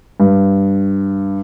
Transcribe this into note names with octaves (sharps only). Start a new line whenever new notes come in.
G2